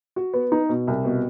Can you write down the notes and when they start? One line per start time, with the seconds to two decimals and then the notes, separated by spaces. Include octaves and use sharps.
0.16 F#4
0.34 B3
0.52 D#4
0.69 B2
0.87 C2
1.05 B2